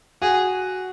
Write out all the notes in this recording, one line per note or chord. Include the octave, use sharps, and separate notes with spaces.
F#4 G#4